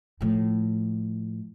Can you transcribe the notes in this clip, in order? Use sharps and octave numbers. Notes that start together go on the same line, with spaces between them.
A2 F3